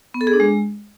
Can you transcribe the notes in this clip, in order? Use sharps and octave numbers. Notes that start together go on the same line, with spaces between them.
B3
A4
G#4
D4
G#3